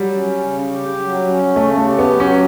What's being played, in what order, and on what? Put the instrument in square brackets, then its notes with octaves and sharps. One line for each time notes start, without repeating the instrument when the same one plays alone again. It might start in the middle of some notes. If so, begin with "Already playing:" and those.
Already playing: [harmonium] F#3 [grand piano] G3
[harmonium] C#4
C#3
G4
F#3
C#4
[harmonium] C#3 [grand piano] A3
[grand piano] A3
[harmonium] G4
[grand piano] B3
[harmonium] F#3
[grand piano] C#4